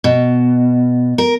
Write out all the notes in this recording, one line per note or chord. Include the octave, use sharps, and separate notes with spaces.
B2
A#4